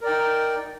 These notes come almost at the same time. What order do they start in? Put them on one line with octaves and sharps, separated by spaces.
A#4 D5 G5 D#4